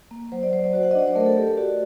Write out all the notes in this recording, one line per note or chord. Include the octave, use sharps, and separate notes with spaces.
A#3
F#3 C5
D5
F#3 C5
D5
F#4 C5
F#5
D#5
D4 D5
C5
A3 A#4
A4
A3 G4
G4
F#4 D5